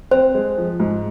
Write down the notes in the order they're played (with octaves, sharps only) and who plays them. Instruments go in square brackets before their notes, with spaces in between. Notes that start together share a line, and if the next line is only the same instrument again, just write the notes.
[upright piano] C4 [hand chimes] C5
[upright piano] G#3
F3
G#2